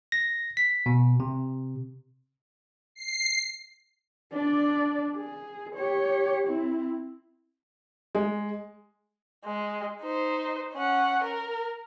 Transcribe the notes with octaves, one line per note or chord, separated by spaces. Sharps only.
A#6
B6
B2
C3
C7
D4 D5
G#4
G4 C#5
C4 E4
G#3
G#3
D#4 C5
C#4 F#5
A#4